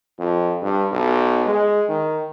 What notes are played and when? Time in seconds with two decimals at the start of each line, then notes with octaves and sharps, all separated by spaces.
0.19 F2
0.62 G2
0.92 B1
1.46 G#3
1.89 D#3